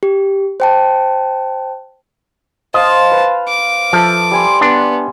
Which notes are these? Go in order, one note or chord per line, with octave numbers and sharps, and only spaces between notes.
G4
C5 G5 A5
C5 D#5 F5 A5
B4
D6
F3 A4 E5 A5
G3 G#5 C6
B3 D4